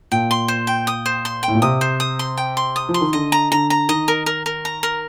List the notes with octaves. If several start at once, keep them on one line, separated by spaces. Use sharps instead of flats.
A#2 G5
C6
C5
G5
D#6
C5
C6
G5
A2
A#2
C3 D#6
C5
D#6
C6
G5
C6
D#6
F3
C6
D#3
D3 D#5
A#5
D3 A#5
A#5
D#3 D#5
A#4
A#4
A#4
A#5
A#4